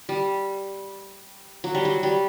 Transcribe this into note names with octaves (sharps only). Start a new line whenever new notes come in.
G3
F#3
G3
F#3
G3